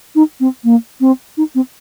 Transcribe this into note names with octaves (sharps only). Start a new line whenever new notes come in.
D#4
C4
A#3
C4
D#4
C4